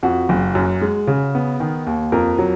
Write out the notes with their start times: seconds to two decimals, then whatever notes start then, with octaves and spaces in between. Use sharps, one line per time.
0.03 F2 F#4
0.29 F#1
0.55 F#2
0.81 G#3
1.07 C#3
1.35 B3
1.60 D#3
1.87 D#2
2.12 F2 A#4
2.39 F#3